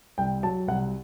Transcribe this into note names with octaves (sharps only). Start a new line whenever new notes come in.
C2 G5
F#3 A5
C2 F#5